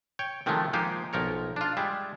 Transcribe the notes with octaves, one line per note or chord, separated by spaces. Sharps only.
C#5 G5
C3 D#3 F3 F#3 G#3 A3
F3 G#3 A#3 D#4 G4 C5
B1 F3 A#4 C#5
D4 F4
G3 G#3 E5